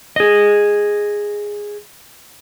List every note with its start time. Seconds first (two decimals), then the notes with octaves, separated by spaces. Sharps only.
0.16 G#4 D#5